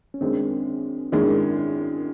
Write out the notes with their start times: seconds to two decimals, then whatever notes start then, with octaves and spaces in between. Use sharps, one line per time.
0.14 C#4
0.21 F#2 D#3 G#3 C4 D4
1.12 F#2 D#3 G#3 D4 E4